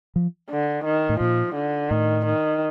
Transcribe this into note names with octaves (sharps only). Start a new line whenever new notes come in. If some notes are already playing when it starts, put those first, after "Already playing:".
F3
D3
D#3
A2
A#2 F3
D3
A2 D#3
D#3